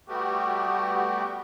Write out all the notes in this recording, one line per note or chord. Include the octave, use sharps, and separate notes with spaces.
G3 A3 B3 F#4 G4